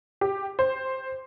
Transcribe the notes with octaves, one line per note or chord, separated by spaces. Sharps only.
G4
C5